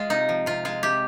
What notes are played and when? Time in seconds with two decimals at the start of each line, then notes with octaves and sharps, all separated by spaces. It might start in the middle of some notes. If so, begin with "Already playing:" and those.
Already playing: G#3 F4
0.10 C3 D#4
0.29 F3
0.46 C3 F4
0.65 G#3 F4
0.83 C3 G4